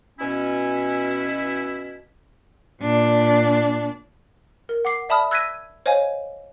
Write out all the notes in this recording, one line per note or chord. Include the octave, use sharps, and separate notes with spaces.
B2 C#4 E4
A#2 D4
A#4
F#5 D6 C7
D5 E5 A5 B5 D#6 F6
E6 F#6 G#6 A#6 B6 D#7
C5 C#5 D#5 F5 G#5